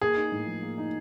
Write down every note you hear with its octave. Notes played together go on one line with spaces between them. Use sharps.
A#3 G#4
D#4
A2
F3
A#3
D#4